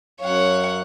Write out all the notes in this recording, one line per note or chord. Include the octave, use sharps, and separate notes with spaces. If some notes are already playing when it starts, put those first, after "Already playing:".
F#2 F#3 C#5 F5 F#5